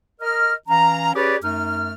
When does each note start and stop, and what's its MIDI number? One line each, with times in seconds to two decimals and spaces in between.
0.21 0.53 70
0.21 0.53 75
0.21 0.53 89
0.68 1.14 52
0.68 1.14 61
0.68 1.14 77
0.68 1.14 82
1.15 1.37 61
1.15 1.37 67
1.15 1.37 68
1.15 1.37 71
1.15 1.37 73
1.15 1.37 74
1.43 1.93 42
1.43 1.93 57
1.43 1.93 63
1.43 1.93 89